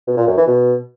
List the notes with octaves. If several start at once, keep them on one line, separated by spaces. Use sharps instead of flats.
B2
A#2
F#2
E3
B2